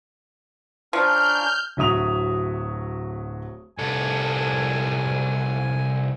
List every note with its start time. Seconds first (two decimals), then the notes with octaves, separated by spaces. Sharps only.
0.93 F3 C#4 D4 A#4 F6 G6
1.77 D1 F#3 E5 D#6 F7
3.78 C2 A4 G#5